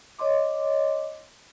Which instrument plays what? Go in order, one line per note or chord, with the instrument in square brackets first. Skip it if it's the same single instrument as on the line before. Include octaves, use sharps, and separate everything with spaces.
[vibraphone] C#5 D#5 C6 D6